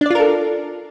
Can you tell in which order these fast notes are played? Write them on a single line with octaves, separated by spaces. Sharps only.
D4 D5 F4 A#4 A4